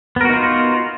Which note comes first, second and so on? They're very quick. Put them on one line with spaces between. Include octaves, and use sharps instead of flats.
B3 A#4 F#4 D#4 F4